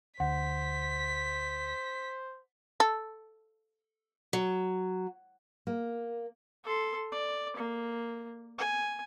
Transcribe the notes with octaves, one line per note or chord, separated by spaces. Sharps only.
D2 C5 F#5 B6
A4
F#3
A#3
A4 C6
D5
A#3
G#5